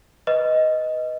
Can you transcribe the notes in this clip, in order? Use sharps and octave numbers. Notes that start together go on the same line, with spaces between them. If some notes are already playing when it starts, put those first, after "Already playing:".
B4 D#5